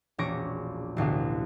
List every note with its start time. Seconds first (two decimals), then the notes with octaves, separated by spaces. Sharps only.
0.18 E1 A#1 C#4 C#6 A#6 D7
0.97 A1 D2 B2 F5